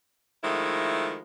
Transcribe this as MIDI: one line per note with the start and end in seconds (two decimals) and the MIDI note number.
0.43 1.19 51
0.43 1.19 53
0.43 1.19 56
0.43 1.19 57
0.43 1.19 64